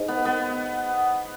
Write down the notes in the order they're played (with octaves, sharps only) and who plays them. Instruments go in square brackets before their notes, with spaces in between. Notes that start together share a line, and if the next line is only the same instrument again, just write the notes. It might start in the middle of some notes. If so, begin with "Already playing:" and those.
Already playing: [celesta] D#4 G#4 C5 D#5
[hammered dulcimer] B3
B3